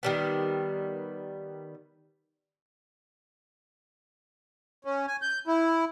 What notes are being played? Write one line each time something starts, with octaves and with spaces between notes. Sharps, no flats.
D#3 G3 B3
C#4
G#5
G6
E4